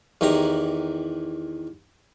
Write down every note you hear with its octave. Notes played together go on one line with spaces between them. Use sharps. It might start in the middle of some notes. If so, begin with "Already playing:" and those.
E2 D#3 E3 G4 A#5